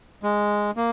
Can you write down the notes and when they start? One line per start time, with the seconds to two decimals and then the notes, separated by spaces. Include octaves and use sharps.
0.23 G#3
0.77 A#3